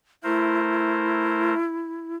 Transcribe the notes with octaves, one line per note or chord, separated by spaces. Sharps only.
A3 E4 A#4 C5